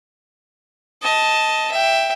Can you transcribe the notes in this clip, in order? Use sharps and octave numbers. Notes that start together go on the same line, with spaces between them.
D#5 A5
E5 G5